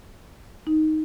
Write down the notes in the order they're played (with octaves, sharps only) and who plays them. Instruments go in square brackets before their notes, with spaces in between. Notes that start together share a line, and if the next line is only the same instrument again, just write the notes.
[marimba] D#4